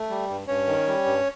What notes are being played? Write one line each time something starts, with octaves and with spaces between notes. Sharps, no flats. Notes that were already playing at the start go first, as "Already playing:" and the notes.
Already playing: A3
G3
G2
G2 C#4 C#5
D#3
G3
G2